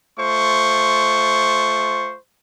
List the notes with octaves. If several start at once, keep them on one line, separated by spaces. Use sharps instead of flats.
A3 F4 C5 C#6